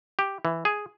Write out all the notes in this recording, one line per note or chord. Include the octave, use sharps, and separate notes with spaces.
G4
E3
G#4